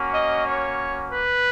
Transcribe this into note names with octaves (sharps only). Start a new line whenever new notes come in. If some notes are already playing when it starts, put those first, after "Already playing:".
Already playing: A#3 C#4 F#4
D#5
C#5
B4